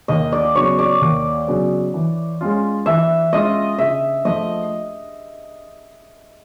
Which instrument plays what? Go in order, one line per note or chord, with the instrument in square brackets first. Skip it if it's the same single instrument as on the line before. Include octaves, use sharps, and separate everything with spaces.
[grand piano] D#2 [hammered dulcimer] D#5
[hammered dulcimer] D5
[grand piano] C#3 F#3 B3 [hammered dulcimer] C#5
[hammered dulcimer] D5
[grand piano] D#2
C#3 F#3 B3
E3
G#3 C#4 F4
[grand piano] E3 [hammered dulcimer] E5
[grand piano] G#3 C#4 F4 [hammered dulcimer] D#5
[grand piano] C#3 [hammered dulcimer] E5
[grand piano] F3 A3 [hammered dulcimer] D#5